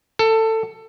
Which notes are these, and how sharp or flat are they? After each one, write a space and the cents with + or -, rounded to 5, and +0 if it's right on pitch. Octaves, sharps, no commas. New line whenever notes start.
A4 +20